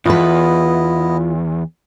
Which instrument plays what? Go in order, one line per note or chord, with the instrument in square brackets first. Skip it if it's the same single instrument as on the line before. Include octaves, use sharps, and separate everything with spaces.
[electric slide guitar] E2 [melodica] B3 E4 D#5 [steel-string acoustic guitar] F4 B4